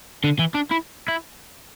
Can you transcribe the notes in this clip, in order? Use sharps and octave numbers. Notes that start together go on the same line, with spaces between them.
D3
E3
D4
E4
E4